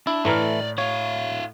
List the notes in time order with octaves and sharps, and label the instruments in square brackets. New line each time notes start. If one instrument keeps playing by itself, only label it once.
[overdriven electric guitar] D4 [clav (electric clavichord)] E4
[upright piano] A2 A#5 F6 [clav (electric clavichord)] E3 A3 [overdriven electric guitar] C#5 D5
[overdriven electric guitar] E4 F5 [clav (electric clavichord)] C#5